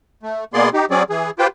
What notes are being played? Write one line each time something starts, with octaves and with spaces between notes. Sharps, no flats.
A3
B2 A#3 B3 G#4 D5 C6
D#4 G4
F#3 C4 C#4 G#4 D5
E3 G#4
F4 G4 B4 C5 G5